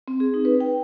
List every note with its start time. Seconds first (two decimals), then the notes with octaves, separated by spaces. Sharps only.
0.08 C4
0.20 G#4
0.34 D#4
0.45 B4
0.60 G5